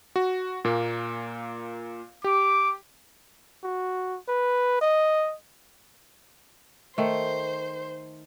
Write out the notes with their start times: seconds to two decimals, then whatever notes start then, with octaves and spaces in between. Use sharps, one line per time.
0.16 F#4
0.65 A#2 A#3
2.24 G4 D6
3.64 F#4
4.28 B4
4.81 D#5
6.98 D#3 A3 C5